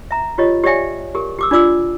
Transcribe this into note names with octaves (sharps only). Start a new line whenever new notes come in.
E5 A#5
F4 G4 C#5 D#5
G4 C#5 D5 E5 G5 G#5
G4 G#4 A#4
G4 D6 E6
D4 F4 D5 D6 E6